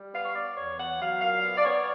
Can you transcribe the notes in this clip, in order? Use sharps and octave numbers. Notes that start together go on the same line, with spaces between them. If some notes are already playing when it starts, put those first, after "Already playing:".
Already playing: G3
B3 F5
C#5
B3 D5
E2 C#5
B3 F#5
F#3 F5
A#2 F5
B3
D5
B3 C#5